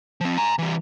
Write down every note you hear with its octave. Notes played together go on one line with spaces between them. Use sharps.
F3 C4
G#5 A#5
E3 G3